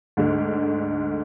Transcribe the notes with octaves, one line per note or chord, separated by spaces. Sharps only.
D2 G#2 D3